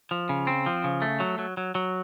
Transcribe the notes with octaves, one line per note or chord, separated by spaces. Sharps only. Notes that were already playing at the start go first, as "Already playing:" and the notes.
F3
C#3
C4
F3
C#3
A3
F#3
F#3
F#3
F#3